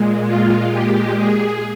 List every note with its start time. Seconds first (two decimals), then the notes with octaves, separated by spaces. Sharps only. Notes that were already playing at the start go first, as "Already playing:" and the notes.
Already playing: A#2 G#3
0.26 F4
0.72 G4
1.16 G#4